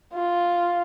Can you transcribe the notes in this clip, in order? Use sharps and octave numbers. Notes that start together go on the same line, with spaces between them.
F4